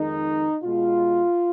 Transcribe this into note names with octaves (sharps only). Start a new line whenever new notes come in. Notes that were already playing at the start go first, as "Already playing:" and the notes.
Already playing: F2 D#3 G#3 D#4
B2 G#3 F4